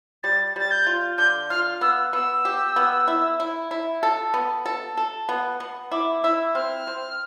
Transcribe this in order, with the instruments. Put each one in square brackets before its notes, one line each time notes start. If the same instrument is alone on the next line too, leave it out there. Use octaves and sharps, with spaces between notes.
[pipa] G3 [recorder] A6
[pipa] G3 [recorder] A6
[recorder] G6
[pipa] F4
[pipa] D3 [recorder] G6
[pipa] F4 [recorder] F6
[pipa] B3 [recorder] E6
[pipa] B3 [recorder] E6
[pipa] G4
B3
E4
E4
E4
A4
B3
A4
A4
B3
B3
[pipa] E4 [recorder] D6
[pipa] E4 [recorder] E6
[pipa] C4 [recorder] F6
[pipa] C4